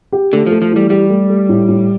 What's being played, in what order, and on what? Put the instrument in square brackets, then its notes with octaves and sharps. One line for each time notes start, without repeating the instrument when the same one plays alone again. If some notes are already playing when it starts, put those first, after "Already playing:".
[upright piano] G4
[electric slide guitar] D3 [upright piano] A3
[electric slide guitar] F3 [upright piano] A3
[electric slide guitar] F3
[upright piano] E3 [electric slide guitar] G3
[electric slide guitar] G3 [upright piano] G4
[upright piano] A3
A3
A2
A2